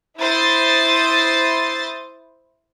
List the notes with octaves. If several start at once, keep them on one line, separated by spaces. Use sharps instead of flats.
E4 C5 D#6 A6 C7